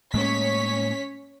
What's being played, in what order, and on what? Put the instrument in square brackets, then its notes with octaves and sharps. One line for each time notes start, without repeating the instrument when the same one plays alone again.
[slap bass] A2 G#3 A#3 [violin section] C#4 C#5 B6